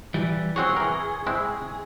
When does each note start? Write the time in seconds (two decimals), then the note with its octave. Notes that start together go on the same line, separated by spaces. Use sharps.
0.14 E3 G3
0.56 C4 F#4 G#4 C#5 C#6
0.77 E3 A#4
1.27 G#3 C4 E4